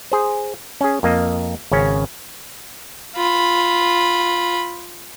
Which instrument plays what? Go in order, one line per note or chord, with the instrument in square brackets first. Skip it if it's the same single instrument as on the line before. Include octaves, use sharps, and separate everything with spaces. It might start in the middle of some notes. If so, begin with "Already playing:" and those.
[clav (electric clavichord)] G#4 C5
C#4 G#4
F2 A#3 D#5
G#1 C#3 C#4
[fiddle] F4 B5